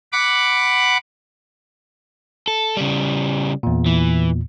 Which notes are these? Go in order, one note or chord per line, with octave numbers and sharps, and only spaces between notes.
F#5 B5 D6
A4
C#3 G3
E2 A#2
E3